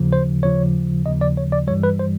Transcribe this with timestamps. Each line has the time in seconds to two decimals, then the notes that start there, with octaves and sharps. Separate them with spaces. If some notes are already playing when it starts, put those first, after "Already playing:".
Already playing: D#2 C#3 F3
0.13 C5
0.43 D#2 C#3 F3 C#5
1.05 D#2 C#3 F3 D#5
1.21 D5
1.37 C#5
1.52 D5
1.67 G2 E3 G3 C#5
1.83 B4
1.99 C5